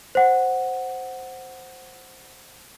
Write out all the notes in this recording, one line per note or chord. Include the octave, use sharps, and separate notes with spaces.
C5 F#5